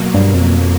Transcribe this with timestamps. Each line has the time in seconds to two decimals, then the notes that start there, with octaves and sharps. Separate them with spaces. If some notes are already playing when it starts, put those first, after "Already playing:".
Already playing: B2 F#3 A#3
0.14 G2
0.34 F2